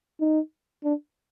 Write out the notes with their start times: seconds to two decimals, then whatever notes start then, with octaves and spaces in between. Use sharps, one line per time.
0.20 D#4
0.84 D4